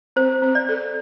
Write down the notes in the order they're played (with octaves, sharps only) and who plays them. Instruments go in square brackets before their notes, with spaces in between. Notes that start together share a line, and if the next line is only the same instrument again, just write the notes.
[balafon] C4 [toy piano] C5
[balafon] C4
[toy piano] D5
[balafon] A4